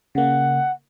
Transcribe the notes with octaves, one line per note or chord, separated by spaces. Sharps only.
C#3 A#3 F#5